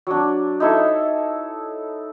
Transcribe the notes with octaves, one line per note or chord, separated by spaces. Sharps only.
F#3 D4
D#4 E4 A4 C#5